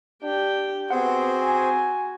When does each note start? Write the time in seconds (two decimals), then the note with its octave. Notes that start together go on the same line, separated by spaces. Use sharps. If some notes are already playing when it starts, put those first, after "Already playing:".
0.23 D4 G4 G5
0.90 B3 C4 F#4 G#4 C5 F#5
1.42 G#5